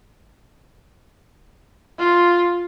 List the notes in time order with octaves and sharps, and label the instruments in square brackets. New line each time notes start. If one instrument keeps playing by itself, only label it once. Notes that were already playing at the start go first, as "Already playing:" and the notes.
[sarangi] F4